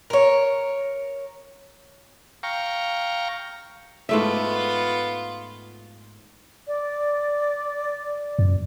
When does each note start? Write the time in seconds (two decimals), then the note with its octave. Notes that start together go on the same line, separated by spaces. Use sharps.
0.10 A#4 C#5
2.43 F5 G5 A#5 C#6
4.09 G#2 A3 B3 F4 E5
6.67 D5
8.39 F#2